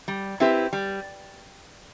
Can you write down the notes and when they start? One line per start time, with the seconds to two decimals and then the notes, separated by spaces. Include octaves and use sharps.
0.08 G3
0.40 C4 E4 G4 B4
0.73 G3